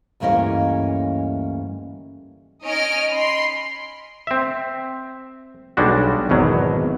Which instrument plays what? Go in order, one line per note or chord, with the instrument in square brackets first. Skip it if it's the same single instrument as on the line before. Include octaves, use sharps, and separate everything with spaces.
[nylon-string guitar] D2 G2 E3 A#3 C#4 D#5
[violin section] C#4 D#4 C#5 D#5 F6 D7
B5 C6
[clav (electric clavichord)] C4 E5
B1 G3 G#3 D4 F#4
G#1 E2 B2 F#3